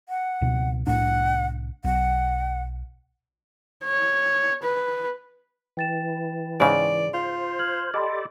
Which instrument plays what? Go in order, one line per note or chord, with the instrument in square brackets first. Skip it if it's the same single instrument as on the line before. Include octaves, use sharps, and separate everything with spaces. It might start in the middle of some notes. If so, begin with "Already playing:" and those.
[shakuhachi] F#5
[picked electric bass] C#2 B2
[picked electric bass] C2 A2 D4 [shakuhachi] F#5
[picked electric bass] B1 [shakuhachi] F#5
[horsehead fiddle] C#5
B4
[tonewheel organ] E3 [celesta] G5 A6 E7
[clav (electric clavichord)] G#2 C#3 [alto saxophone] D5
[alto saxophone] F4 [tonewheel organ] C5 [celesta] F5
[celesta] F6 G#6 F#7
[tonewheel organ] G4 A4 D5 [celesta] D#5 B5 C6